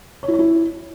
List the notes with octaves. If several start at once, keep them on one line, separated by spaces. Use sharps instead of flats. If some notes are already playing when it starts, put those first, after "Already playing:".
C#5
E4
C#5
E4